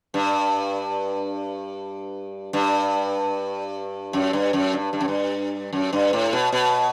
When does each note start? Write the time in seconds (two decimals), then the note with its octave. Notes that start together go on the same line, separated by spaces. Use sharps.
0.14 G2
2.53 G2
4.13 F#2
4.33 G2
4.53 F#2
4.73 G2
4.93 G2
5.01 F#2
5.08 G2
5.73 F#2
5.93 G2
6.13 A2
6.33 B2
6.52 B2